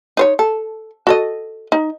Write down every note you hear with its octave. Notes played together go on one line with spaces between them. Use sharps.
D#4 C5 C#5
A4
F#4 A4 D#5
D#4